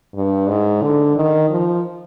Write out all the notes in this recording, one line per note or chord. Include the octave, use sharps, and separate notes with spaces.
G2
G#2
D3
D#3
F3